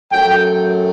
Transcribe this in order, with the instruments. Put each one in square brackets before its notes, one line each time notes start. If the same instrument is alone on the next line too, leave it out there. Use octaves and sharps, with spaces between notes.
[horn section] F#2 F#3 A3 G5